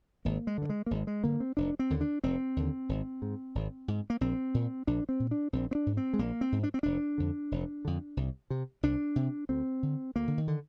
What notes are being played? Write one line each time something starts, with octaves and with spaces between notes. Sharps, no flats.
G#1 A#3
G#3
G2 D3
G#3
A#3
G#1 G#3
G#3
G2 D3 A#3
C4
F1 D4
C4
D#2 D3
D4
F1 C4
D#2 D3
G#1
G#2
G#1
G#2
A#3
A#1 C4
A#2
A#1 D4
C4
A#2
D4
A#1 C4
C4
D4
G#2
C4
G#3
A#1 A#3
C4
G#2
D4
C4
F1 D4
F2 D3
F1
F2 D3
C2
C3
C2 D4
C3
D2 C4
D3
D2 A#3
D3
D#3
D3